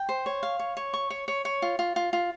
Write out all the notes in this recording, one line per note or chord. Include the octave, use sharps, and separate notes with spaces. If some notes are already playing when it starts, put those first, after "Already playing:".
Already playing: G5
C5
C#5
F5
C#5
C#5
C#6
C#5
C#5
C#5
F4
F4
F4
F4